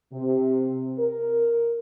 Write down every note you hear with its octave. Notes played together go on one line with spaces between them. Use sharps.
C3
A#4